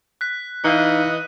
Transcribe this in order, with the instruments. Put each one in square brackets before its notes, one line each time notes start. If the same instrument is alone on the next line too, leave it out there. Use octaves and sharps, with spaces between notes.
[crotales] F#6 B6
[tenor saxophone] E3 [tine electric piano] D#4 F5 G6 [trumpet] D#5 [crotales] C#7 D#7